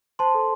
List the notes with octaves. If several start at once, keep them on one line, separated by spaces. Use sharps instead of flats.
C5 A5 C6
A4